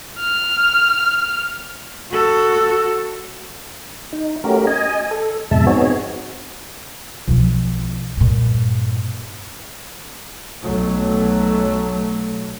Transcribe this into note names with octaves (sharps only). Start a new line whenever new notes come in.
F6
F#4 A4
D#4
A3 C#4 F#4 G4 A#4
D#5 G#5
A4
F2 G#2 B2 G#3 E5 A5
B3 C4 D#4 F#4 G#4 C#5
B1 F3
G2 A#2
B1 F#3 A3